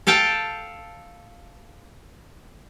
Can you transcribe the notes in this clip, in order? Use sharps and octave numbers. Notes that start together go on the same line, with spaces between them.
A4 F5 G5 A5